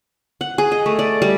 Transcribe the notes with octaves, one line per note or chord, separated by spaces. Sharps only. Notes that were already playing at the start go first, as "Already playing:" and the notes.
F#5
G#4
D#5
A3
D5
G3